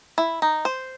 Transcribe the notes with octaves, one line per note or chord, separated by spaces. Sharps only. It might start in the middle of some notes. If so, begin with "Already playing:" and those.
E4
D#4
C5